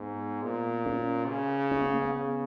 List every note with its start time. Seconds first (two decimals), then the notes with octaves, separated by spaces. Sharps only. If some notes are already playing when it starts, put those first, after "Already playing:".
Already playing: G#2 B3
0.43 A#2
0.86 C#4
1.28 C#3
1.71 C#4
1.81 B3
1.91 A#3
2.02 B3
2.13 C#3